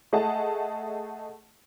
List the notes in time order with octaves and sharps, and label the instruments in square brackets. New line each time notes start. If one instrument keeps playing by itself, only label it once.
[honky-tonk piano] A3 G#4 D#5 F#5 A5